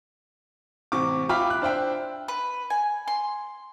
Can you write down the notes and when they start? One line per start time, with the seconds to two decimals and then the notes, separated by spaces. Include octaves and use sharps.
0.92 A1 C3 C#6 D6
1.29 F4 E5 G5 B5 D6 F6
1.50 F#6
1.62 D4 C5 E5 G5
2.28 B4
2.70 G#5
3.08 C6